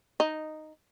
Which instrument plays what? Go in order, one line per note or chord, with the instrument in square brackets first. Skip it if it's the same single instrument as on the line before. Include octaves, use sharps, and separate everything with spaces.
[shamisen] D#4